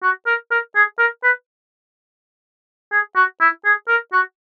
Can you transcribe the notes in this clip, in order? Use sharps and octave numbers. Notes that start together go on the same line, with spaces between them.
F#4
A#4
A#4
G#4
A#4
B4
G#4
F#4
E4
G#4
A#4
F#4